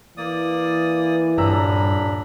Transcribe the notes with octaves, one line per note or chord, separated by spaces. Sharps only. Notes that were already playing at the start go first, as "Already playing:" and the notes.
E3 A#3 D5 D#6
D#1 G2 D4 A#5 B5 E6